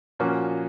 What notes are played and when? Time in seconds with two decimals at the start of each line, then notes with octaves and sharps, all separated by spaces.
0.19 A#2 F3 A#3 C#4 F#4